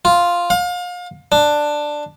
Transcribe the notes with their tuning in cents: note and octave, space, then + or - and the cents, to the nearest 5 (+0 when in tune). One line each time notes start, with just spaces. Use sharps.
F4 +0
F5 +35
D4 +10